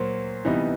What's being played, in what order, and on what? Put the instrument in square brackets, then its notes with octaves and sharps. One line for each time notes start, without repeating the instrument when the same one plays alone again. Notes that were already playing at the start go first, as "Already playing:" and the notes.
Already playing: [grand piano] A#2 F#3 A#3 [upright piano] C5
[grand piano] C3 E3 G3 B3 D#4